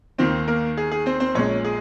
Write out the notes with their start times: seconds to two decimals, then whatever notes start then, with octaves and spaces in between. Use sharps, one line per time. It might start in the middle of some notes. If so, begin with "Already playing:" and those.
0.18 D#2 D#3 A#3 C4 C5
0.48 A#3 A#4
0.77 G#4
0.91 G#4
1.06 C4 C5
1.20 C4 C5
1.35 A#1 A#2 G#3 C#4 C#5
1.64 G#4